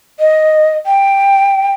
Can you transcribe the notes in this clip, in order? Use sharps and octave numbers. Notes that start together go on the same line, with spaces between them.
D#5
G5